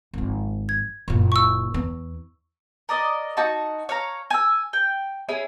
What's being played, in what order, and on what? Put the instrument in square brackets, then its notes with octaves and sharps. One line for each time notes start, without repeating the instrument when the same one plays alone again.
[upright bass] G#1 F3
[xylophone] G#6
[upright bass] F#1 A#2
[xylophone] C#6 E6
[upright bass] E2 B3
[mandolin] A#4 D5 D#5
D#4 F#4 A5
C#5 F5 A#5
G#5 E6
G5
C#4 E4 G#4